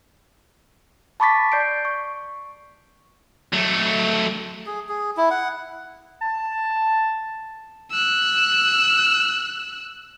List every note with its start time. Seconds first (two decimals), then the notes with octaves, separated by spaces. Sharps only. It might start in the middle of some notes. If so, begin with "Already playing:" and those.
1.20 A5 B5 C#6 D6 A6 B6
1.52 D5 G6 C7 D7
1.85 C#6
3.53 F#3 A3
4.66 G#4
4.89 G#4
5.17 E4
5.30 F#5
6.22 A5
7.91 E6 F#6